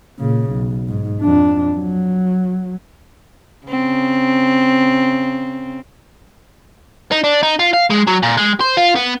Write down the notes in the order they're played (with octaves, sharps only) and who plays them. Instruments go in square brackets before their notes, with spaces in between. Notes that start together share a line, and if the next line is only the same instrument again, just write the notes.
[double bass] A#2 C#3
B1
G#2
F2 D4
F#3
[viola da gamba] C#3 C4
[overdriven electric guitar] D#4
D4
D#4
F4
F5
G#3
F#3
A#2
G#3
C5
F4
B3